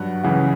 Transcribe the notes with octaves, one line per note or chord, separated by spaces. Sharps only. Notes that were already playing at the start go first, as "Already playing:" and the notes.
Already playing: G2 F#3 F#5
C#2 C#3 E3 F#5